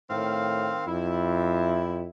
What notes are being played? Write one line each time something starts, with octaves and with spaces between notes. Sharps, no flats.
A2 D#3 C4 F5
F2 E4